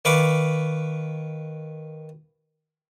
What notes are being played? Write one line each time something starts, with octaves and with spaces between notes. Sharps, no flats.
D#3 B4 F5 B5 C#6 D6